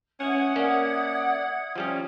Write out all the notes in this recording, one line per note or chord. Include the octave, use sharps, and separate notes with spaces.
C#4 E5 F#5 D#6 G#6
A#3 C#4 D5
F3 G3 C#4